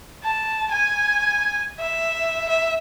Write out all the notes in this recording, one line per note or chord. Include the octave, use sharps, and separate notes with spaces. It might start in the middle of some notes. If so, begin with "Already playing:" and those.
A5
G#5
E5
E5